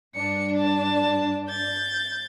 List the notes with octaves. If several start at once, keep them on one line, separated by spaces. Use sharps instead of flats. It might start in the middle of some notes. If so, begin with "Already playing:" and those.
G2 D4 C#7
A5
G6 A6